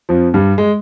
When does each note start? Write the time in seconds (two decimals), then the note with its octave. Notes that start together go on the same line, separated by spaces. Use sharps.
0.09 F2 F3
0.34 G2 G3
0.58 G#3